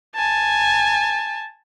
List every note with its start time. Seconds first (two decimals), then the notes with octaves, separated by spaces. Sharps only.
0.15 G#5 A5